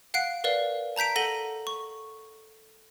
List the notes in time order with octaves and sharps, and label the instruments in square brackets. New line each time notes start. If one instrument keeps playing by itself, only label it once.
[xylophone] F5 F#5 F#6 C7 D7
A#4 B4 D5 F5
A5 A#5 G6 B6 D7
A4 F#5 A#6 D#7 F#7 G7
C#6